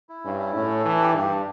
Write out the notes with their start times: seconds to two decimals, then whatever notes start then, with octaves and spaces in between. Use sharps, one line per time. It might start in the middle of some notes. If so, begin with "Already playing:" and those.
0.09 E4
0.24 G2 C#4
0.39 E4
0.55 A2 C#4
0.70 A4
0.85 E3 D4
1.00 G4
1.15 G2 G4
1.31 D4